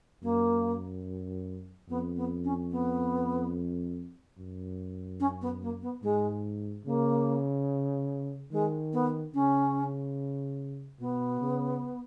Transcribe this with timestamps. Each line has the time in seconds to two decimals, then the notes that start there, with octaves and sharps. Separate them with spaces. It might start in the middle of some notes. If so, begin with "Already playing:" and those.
0.23 F#2 A#3
1.89 F2 B3
2.16 B3
2.44 C#4
2.71 B3
4.38 F#2
5.20 C#4
5.41 B3
5.62 A#3
5.82 B3
6.03 G#2 G#3
6.85 C#3 A#3
8.52 D#3 G#3
8.93 B3
9.34 C#3 C#4
11.00 B2 B3
11.41 C#3